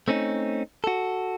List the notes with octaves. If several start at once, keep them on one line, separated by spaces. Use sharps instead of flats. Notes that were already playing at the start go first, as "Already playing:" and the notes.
A3 C4 C#4 D#4
F#4 A4